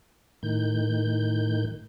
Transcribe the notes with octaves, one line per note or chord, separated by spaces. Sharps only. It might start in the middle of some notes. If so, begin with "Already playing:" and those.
A2 D#3 G6